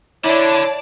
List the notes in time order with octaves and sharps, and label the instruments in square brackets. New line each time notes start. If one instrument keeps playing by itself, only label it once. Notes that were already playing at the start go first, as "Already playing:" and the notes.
[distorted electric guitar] D3 [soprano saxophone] E4 [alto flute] C#5 [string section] D5 A5